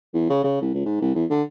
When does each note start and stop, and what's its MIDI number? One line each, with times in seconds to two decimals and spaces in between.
0.14 0.29 40
0.30 0.42 49
0.44 0.57 49
0.61 0.70 36
0.74 0.82 37
0.86 0.98 44
1.01 1.10 36
1.15 1.25 40
1.30 1.43 50